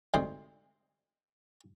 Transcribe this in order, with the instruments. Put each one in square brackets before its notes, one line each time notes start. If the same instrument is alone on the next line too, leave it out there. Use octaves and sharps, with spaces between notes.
[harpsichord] D2 G#2 C3 C5